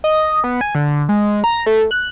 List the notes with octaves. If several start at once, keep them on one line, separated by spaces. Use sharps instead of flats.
D#5
B3
G#5
D3
G#3
A#5
A3
F#6